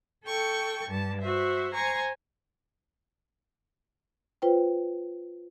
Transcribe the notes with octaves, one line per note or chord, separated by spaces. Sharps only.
A4 G5 C#6
G2 A5
F#4 C5 E5
C5 G#5 A#5 C#6
F4 B4 C5 G5